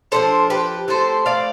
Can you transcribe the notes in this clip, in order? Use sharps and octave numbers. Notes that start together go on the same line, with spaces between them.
F3 B3 D4 A4 C5
G4 B4
F3 A3 C4 E4 A4 C5
D5 F5